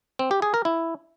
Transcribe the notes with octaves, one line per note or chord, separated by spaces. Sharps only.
C4
G4
G#4
A#4
E4